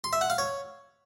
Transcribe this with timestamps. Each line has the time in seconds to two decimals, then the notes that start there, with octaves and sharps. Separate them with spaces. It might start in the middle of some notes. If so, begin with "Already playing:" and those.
0.04 C6
0.13 E5
0.21 F#5
0.30 F5
0.38 C#5